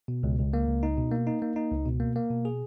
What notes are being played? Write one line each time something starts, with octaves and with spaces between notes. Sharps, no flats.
B2
C#2
C#2
A#3
C#2
D#4
B2
A#3
D#4
A#3
D#4
C#2
B2
A#3
A#3
B2
G#4